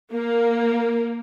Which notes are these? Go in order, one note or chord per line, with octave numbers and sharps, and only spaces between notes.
A#3